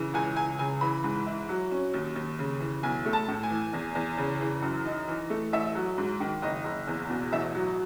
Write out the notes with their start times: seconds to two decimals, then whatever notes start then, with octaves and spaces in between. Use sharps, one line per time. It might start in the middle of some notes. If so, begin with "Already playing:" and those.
Already playing: C#3 E3
0.14 C#2 G#5
0.36 C#2 G#5
0.59 C#3 G#5
0.81 E3 B5
1.04 G#2
1.26 E4
1.49 F#3
1.71 C#4
1.94 D#2
2.16 D#2
2.39 C#3
2.60 E3
2.83 B1 G#5
3.05 A3
3.13 A5
3.28 A2
3.43 G#5
3.50 E3
3.73 E2
3.95 E2
4.18 C#3
4.41 E3
4.62 F#2
4.85 D#4
5.08 E3
5.30 A3
5.53 A1 E5
5.75 F#3
5.98 G#2
6.20 D#3
6.42 F#1 D#5
6.64 F#1
6.87 E2
7.10 B2
7.32 A1 E5
7.55 F#3